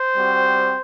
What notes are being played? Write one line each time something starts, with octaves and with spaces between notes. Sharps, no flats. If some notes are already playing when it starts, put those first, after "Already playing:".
Already playing: C5
G3 C4 F#4